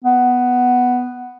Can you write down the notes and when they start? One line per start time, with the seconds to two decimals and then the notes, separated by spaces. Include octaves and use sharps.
0.04 B3